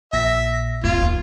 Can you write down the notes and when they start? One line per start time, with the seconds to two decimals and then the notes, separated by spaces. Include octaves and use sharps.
0.13 A#1 A#2 E5 A#6
0.84 D1 A2 F4 G#6
1.03 D#2